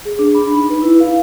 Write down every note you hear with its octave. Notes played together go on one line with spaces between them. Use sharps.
G#4
D4
B5
D#4
B4
E4
F5